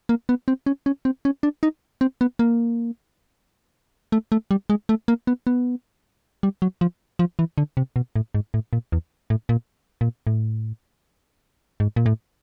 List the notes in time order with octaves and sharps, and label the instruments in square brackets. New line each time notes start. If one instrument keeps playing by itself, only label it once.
[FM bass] A#3
B3
C4
C#4
C#4
C4
C#4
D4
D#4
C4
B3
A#3
A3
A3
G3
G#3
A3
A#3
B3
B3
G3
F#3
F3
F3
E3
D3
C3
B2
A2
G#2
A2
A#2
E2
A2
A#2
A#2
A2
G#2
A#2
A2